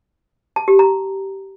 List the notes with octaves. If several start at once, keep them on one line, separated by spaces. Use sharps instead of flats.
A5
G4
A#5